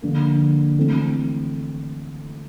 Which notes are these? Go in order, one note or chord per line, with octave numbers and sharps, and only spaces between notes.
D3 F3 A#3
E3 A3 C4